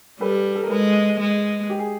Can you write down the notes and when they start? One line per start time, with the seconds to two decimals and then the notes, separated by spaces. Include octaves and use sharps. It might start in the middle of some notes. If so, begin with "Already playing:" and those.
0.20 G3 A4 B4
0.55 A4
0.63 A#4
0.70 G#3 A4 B4
1.20 G#3
1.70 G4
1.79 G#4